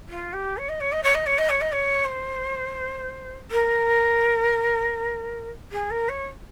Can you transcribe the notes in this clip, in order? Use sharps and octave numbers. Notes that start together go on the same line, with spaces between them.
F4
G4
C#5
D#5
C#5
D#5
C#5
D#5
C#5
D#5
C#5
D#5
C#5
C5
A#4
G#4
A#4
C#5